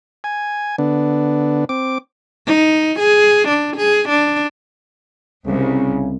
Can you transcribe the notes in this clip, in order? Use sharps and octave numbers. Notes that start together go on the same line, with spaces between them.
G#5
D3 B3 D4
C4 D6
D#4
G#4
D4
G#4
D4
C2 C#3